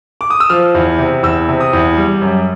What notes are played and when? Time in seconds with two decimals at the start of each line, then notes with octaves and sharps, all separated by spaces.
0.21 D6
0.30 D#6
0.40 E6
0.50 F3 F6
0.74 E2
0.99 C3
1.23 E2 E6
1.49 C3
1.60 D#6
1.73 E2
1.97 G3
2.22 F#2